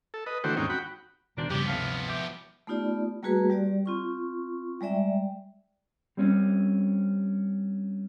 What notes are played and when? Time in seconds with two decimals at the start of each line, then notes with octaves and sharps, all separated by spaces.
0.14 A4
0.26 B4 D#5
0.44 D3 E3 A3 F#4 C5 G5
0.57 D#2 G#2 C4 C#4 D#4 G5
0.70 F#4 G5 B5
1.37 E2 B2 D#3 A#3 C4 D4
1.50 G2 C#3 F3 B3 G4
1.67 G1 D2 A2 C3 F5
2.09 G4 E5
2.67 A3 B3 D#4 F4 G4 D5
3.23 G3 A3 A#3 F#4 G#4 B4
3.50 G3 G4 D5
3.86 C4 F4 C#6
4.81 G3 G#3 D5 E5 G5
6.17 G3 C4 C#4